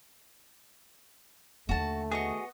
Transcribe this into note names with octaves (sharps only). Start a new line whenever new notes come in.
D#2 D3 A3 F#4 A5
B3 F#4 G#4 D#5 C#6